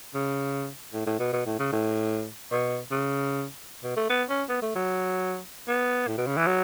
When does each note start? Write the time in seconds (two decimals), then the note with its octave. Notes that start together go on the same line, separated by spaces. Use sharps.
0.14 C#3
0.93 A2
1.07 A2
1.20 B2
1.33 B2
1.46 A2
1.59 C#3
1.73 A2
2.52 B2
2.91 C#3
3.84 B2
3.97 A3
4.10 B3
4.30 C#4
4.49 B3
4.63 A3
4.76 F#3
5.68 B3
6.08 A2
6.18 B2
6.27 C#3
6.37 E3
6.47 F#3